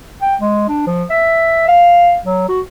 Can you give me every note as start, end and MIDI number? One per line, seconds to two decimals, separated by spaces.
0.22 0.36 79
0.41 0.64 56
0.69 0.83 62
0.87 1.04 53
1.10 1.67 76
1.68 2.17 77
2.25 2.46 54
2.49 2.61 66